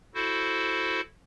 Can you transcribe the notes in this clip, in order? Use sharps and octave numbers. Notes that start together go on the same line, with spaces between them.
E4 F#4 A4 C5